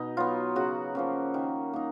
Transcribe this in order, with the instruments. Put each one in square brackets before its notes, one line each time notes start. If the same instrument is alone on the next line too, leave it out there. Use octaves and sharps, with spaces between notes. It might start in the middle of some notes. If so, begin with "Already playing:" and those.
Already playing: [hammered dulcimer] B2 D#4
F#3 B3 F4
C#3 F#4
F3 A#3 C#4
D#3
A#3 D#4